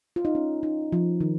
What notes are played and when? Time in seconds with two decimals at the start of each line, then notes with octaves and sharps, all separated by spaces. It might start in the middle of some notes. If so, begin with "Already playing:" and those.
0.16 F4
0.25 D#4
0.35 C#4
0.63 D#4
0.92 F3
1.21 D#3